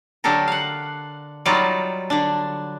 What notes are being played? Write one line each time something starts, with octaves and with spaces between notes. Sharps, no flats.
D3 F#3 D4 G4 A4 A#4
F5 F#5
F#3 G3 D#4 F4 D5
D3 D4